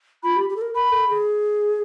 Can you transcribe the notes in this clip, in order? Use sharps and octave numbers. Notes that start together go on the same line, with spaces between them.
F4 B5
G4
G4
A4
A#4
A#4 B5
A4
G#4